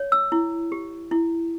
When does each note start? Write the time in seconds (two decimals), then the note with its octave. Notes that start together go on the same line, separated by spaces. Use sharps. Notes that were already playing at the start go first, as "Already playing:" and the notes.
Already playing: C#5
0.12 E6
0.32 E4
0.72 G4
1.11 E4